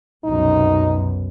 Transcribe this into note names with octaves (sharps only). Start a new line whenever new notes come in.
C2 F#2 B2 D#4